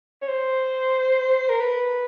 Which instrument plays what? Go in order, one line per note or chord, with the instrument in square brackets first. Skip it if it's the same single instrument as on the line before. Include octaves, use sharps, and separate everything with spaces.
[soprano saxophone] C#5
C5
A#4
B4